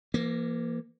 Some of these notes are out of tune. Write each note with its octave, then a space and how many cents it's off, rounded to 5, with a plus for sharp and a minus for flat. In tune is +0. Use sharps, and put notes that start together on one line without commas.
E3 +40 A#3 +0